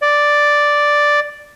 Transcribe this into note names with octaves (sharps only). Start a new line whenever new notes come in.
D5